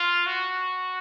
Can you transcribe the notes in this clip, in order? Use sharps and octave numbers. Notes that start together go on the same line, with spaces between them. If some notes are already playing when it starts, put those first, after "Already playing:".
Already playing: F4
F#4